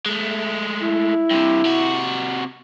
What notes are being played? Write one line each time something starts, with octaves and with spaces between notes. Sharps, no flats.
G#3 A3
E4
G2 C3
C3 F#4